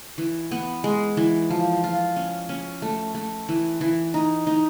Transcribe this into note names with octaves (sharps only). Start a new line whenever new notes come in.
E3
B3
G#3
E3
F3
F4
C#4
C#4
A3
A3
E3
E3
D#4
D#4